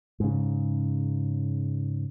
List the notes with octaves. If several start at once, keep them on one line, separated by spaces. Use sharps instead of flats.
G#2 C#3